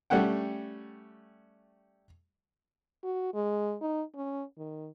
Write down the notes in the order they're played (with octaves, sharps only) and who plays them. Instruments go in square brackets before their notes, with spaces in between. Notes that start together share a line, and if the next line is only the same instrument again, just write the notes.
[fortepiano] G3 A3 C#4 F#5 G5
[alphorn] F#4
G#3
D#4
C#4
D#3